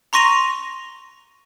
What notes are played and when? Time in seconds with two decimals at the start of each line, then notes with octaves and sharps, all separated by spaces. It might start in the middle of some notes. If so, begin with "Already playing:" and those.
0.13 A#5 C6 C#6 A#6 D#7 F7